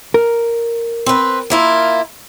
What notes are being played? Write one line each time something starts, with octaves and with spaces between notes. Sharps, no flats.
A#4
C4 B4
A#3 E4 F4